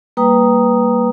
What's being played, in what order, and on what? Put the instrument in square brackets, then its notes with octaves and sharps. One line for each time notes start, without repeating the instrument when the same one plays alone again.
[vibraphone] G3 A#3 B4 G5 A#5 D#6